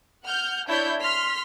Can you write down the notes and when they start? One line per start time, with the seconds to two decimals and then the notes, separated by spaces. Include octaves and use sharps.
0.24 F#5 F6 G6
0.68 D4 E4 C#5 D5 G6
1.00 C6 F6 B6